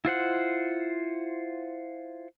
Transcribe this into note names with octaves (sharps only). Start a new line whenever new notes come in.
E4 F4 C5 F#5